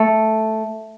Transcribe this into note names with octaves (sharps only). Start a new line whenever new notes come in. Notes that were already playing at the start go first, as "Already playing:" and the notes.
Already playing: A3